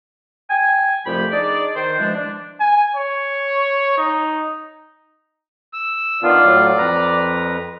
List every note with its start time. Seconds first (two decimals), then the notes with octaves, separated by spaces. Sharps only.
0.49 G5 G#5
1.06 C2 F2 F3 A3 G4 B5
1.31 D4 D#4 G#4 D5
1.75 D#3 C5
1.98 B2 E3 F3 G#3 D4
2.15 D4
2.60 G#5
2.95 C#5
3.98 D#4
5.73 E6
6.23 D#3 B3 D4 F4 D5
6.45 A2 F#3
6.78 F2 B4 A#5